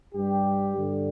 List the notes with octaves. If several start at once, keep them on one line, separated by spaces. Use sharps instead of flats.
G2 G3 G4
G2 D3 G3